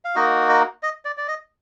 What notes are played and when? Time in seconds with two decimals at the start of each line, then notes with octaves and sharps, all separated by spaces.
0.05 F5
0.15 A#3 D#4 F#4 D#5
0.49 D#5
0.83 D#5
1.05 D5
1.17 D5
1.28 D#5